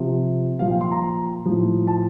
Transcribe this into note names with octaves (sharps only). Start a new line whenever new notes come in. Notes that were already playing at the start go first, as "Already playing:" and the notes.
Already playing: C3 F3
A#2 F3 F5
G5
C6
A#5
A2 F3
A5